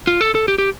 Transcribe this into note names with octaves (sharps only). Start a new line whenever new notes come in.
F4
A4
A4
G4
G4